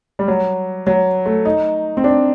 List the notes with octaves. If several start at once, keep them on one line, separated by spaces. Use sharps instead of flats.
G3
F#3
F#3
A3
D#4
C4
D4